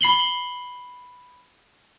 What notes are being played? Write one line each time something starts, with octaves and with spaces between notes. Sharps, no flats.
B5 C7 F#7 G7